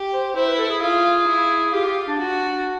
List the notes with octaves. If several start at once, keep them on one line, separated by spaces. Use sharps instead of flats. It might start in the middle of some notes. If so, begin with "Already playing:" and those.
Already playing: G4
C5
E4 C5
B4
A4
G#4
F4 G#4
E4
F4 G4
G4
D4
D4 F#4
D4